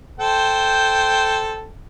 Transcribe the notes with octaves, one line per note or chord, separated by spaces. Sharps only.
A4 C5 G5